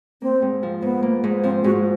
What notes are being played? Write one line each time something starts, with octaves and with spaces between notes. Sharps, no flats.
A#3 C4
G#2
F3
G#2 B3
A#3
G#2
F3 C4
G#2 F#4